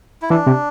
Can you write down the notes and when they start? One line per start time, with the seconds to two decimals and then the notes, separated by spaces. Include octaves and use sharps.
0.22 E4
0.30 E3 D4
0.46 C3